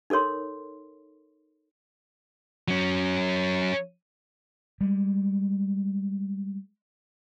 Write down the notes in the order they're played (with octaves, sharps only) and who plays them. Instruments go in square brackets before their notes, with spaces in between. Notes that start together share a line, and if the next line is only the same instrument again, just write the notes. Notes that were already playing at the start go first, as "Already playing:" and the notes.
[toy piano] D#4 A4 A#4 C#5 C6
[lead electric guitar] F#3 C#4
[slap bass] G3 G#3